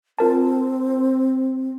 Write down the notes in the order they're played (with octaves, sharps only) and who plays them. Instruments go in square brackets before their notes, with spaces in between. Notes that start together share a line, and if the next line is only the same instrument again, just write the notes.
[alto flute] C4 [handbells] F4 A#4 A5